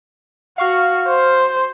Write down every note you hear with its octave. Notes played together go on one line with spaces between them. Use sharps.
F#4 F5 C#6 F6
C5